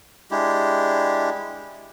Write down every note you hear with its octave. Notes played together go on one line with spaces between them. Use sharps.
G#3 D4 E4 G4